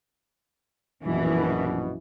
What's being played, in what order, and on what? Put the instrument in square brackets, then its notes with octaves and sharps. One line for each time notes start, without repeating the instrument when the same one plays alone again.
[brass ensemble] A#1 F#2 B2 [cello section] E3